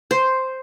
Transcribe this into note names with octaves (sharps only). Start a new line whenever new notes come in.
C5